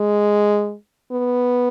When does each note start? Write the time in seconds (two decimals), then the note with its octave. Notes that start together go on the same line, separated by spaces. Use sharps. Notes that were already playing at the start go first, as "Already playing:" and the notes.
Already playing: G#3
1.11 B3